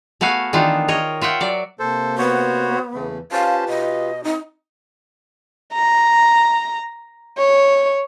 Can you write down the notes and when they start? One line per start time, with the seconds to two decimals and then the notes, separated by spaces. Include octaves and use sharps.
0.21 A3 B3 F#4 F5 G#5
0.53 D#3 E3 D4 D#4 F4
0.88 A#4 C#5 D#5
1.21 F4 E5 F#5 G5
1.40 F#3 D5
1.79 C3 A#3 A4 C5
2.18 B3 F#4 C5 C#5
2.94 E2 C#3 E3 A3
3.32 C#4 F4 G4 B4 C5 F5 A5
3.69 B2 D#5
4.24 C4 D#4
5.74 A#5
7.38 C#5